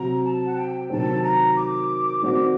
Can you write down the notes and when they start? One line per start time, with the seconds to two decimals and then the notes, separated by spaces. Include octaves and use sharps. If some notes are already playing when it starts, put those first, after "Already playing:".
Already playing: C3 F#3 C4 F#4 A#5
0.24 A5
0.45 F#5
0.57 G5
0.90 C3 D#3 F#3 C4 A5
1.23 A#5
1.56 D6
2.22 D#3 G3 C4 F#4 D6